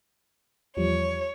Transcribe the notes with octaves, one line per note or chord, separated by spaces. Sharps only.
E2 F3 G3 C#5